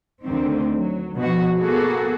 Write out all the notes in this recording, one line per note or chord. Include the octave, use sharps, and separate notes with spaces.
D2 D3 D#3 C4
F#3
B2 F3 F#4
A#3 B3 F#4 G#4 A4